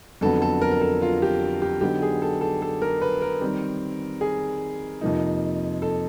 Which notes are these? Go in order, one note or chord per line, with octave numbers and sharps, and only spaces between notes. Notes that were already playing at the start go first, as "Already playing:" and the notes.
F2 D3 F#3 B3 A4
A4
A#4
A#4
A4
F4
G4
G4
D3 F#3 B3 D#4 G4
G#4
A4
A4
A4
A#4
B4
A#4
D#3 G3 C4
G#4
F2 C3 F3 A#3 D#4
A4